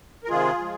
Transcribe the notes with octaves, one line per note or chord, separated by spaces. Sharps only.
A#4
C3 D#3 G#3 F4 G#4
F3 G#3